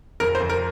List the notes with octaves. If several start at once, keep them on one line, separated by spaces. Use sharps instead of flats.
F2 A#4
C5
F2
A#4